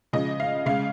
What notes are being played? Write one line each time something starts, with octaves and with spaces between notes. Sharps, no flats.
C#3 F3 G#3 D#5
F5
C#3 G#3 F5